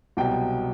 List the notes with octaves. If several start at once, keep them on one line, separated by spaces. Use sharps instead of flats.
C2 B2 F#3 G5